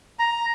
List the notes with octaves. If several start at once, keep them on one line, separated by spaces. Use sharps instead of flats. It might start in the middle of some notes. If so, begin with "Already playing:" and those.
A#5